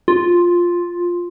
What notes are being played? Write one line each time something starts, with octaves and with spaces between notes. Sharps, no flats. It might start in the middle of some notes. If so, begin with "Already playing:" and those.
F4